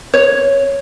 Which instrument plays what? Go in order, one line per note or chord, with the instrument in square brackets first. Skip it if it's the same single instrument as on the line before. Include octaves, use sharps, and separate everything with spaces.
[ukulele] C#5